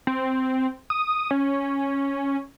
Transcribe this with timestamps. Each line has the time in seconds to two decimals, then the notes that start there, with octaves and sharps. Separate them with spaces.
0.07 C4
0.90 D#6
1.31 C#4